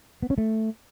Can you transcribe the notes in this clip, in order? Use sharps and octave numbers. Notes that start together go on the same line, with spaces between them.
B3
C#4
A3